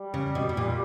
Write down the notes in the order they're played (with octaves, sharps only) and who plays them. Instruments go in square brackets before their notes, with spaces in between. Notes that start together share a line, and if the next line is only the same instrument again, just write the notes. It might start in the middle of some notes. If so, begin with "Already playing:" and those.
Already playing: [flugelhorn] G3
[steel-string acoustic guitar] C#3
B2
B2
A#2